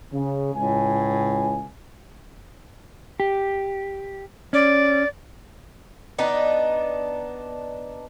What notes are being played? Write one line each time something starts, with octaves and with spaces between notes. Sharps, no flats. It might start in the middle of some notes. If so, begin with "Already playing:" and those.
C#3
C#2 A2 G#5
G4
C#4 D5
B3 D4 D#4